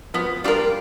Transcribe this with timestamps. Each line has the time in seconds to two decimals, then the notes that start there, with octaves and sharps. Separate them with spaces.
0.14 F3 B3
0.44 G3 D4 F4 A#4